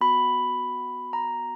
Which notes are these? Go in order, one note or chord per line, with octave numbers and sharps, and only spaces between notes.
B3 F#4 B5
A#5